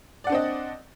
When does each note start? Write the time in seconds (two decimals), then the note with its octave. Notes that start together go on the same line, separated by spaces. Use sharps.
0.24 D5
0.27 F#5
0.29 D4
0.32 C4
0.35 D#5